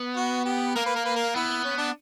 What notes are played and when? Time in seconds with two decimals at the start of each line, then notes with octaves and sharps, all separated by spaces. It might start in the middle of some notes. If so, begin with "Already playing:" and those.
Already playing: B3
0.16 F#4
0.45 G4
0.75 A#3 A#4
0.86 B4
0.96 A#4
1.05 B4
1.16 A#4
1.35 B3 E4
1.64 C#4
1.78 D4